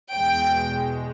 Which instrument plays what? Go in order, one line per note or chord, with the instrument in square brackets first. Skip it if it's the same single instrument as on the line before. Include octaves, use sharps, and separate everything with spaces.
[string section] E2 B2 G#3 G5